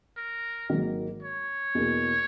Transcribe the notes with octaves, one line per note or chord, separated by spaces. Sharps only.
A#4
G#1 G#2 D#3 F#3 A#3
C#5
E2 B2 A#3 E4